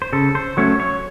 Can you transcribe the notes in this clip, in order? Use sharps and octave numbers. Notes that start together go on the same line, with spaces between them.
C5
C#3 A4
C5
F#3 A3 C#4 C#5
C#5